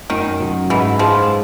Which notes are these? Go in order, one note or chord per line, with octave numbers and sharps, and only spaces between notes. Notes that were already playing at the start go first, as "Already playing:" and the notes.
F#2 D#3
F#3
G#2 E3
F3 G#3